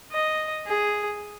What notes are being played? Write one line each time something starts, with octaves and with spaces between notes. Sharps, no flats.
D#5
G#4